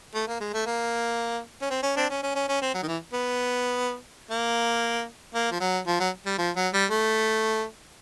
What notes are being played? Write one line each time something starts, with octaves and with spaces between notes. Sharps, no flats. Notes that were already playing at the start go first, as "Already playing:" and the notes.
A3
A#3
G#3
A3
A#3
C#4
C4
C#4
C4 D4
C#4
C#4
C#4
C#4
C4
F#3
D#3
E3
B3
A#3
A#3
F3
F#3
F3
F#3
G3
F3
F#3
G3
A3